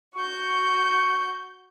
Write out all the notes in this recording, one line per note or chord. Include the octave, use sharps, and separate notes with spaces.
F#4 C#6 G6